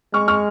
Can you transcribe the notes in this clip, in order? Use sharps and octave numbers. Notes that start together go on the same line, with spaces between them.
G#3 C#6 F6
C#6 F6